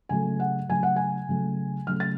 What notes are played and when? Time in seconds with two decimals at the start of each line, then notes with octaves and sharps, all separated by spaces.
0.09 C#3 F#3 A3 G#5
0.40 F#5
0.69 C#3 F#3 A3 G#5
0.83 F#5
0.96 G#5
1.29 C#3 F#3 A3
1.87 C#3 F#3 A3 F6
2.00 A6